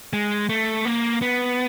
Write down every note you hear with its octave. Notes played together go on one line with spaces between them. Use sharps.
G#3
A3
A#3
B3